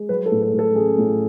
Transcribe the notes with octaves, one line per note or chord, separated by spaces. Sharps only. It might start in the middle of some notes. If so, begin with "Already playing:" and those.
Already playing: G#3
F#3 B4
A4
A2
A4
A2
A4
A1 G#4
A2